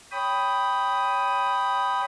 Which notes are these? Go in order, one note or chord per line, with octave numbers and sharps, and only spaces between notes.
C#5 G5 B5 D#6